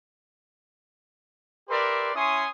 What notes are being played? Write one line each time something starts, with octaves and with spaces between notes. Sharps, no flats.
G4 A#4 B4 D5 E5 C6
C#4 E4 C#5 G#5 C6 D#6